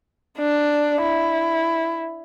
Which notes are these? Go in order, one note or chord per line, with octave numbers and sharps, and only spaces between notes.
D4
E4